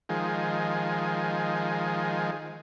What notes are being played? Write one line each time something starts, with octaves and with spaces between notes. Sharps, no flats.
D#3 F3 G#3